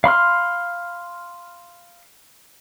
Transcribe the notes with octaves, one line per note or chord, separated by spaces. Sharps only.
F5 B5 C6 F6